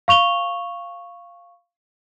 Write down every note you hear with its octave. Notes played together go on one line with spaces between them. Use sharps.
F5 C#6 F7 G7